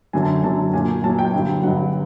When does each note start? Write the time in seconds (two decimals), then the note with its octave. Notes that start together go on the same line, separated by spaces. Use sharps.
0.13 F#2 D3 F#3 G#5
0.23 A5
0.44 F#2 D3 F#3 A5
0.73 A#2 F#3 G#5
1.03 A#2 F#3 A5
1.18 G5
1.34 G2 D3 F#3
1.63 G2 D3 F#3 F#5